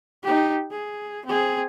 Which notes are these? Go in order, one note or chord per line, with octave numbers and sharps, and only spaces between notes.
D#4 G4
G#4
C4 G#4